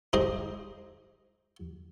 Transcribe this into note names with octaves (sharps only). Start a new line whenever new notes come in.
D#4 G#4 C5 D#5